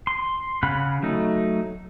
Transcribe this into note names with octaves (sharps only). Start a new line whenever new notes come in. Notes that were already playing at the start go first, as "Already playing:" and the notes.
C6
C#3 F5 F#5 B5
F#3 A3 D#4